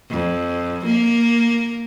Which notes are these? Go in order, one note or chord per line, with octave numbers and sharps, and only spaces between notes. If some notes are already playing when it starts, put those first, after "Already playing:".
F2
A#3